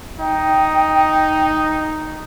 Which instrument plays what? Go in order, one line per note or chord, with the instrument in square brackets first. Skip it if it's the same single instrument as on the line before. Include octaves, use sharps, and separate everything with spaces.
[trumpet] D#4 [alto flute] G5